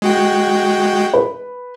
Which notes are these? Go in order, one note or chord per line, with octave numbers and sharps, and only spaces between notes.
G#3 F#4 G5
B4